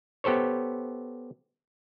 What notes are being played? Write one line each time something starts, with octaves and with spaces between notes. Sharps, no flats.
B3 G4 A4 C5 C#5